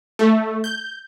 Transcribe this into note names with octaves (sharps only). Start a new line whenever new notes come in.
A3
G6